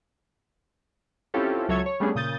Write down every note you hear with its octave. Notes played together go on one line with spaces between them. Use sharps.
C4 C#4 E4 F4 G4 A4
C#2 F#3 A4 C#5 E5 G#6
C#5
G3 A3 B3 C#4 D4 G#4
A#2 C#3 D#6 G6 A6